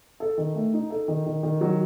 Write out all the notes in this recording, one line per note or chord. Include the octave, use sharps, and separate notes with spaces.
A4
D#3
A3
D#4
A4
D#3
D#3
D#3
F#3